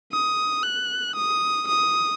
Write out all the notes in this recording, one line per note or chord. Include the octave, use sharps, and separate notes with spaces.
D#6
F#6
D#6
D#6